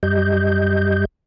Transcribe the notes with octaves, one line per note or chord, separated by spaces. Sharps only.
F#2 G3 G4 D#5 G6